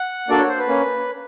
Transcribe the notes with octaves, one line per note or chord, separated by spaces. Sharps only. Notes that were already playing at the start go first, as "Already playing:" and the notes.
Already playing: F#5
A#3 D4 F#4 A4 D5
C#5
C5
B4
A#3 C#4